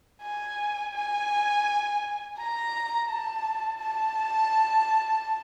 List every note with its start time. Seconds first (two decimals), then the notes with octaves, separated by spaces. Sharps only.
0.22 G#5
0.94 G#5
2.38 A#5
3.08 A5
3.80 A5